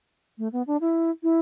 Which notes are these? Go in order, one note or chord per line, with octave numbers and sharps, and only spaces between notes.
A3
B3
D4
E4
E4